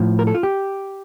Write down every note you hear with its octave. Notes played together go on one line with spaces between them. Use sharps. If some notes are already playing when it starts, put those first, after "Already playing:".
Already playing: A2 F3
A#4
A4
F4
G4